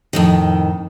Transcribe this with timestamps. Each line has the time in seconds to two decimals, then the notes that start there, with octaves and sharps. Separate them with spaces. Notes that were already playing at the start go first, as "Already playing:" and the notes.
0.13 F2 A2 D#3